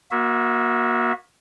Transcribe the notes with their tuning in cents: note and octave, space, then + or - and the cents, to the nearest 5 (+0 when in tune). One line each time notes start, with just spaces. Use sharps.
A#3 +30 F#4 -20 E5 -10